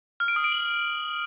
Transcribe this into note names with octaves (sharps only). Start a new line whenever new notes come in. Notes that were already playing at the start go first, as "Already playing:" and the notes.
F6
D7
D#6
D7
F#7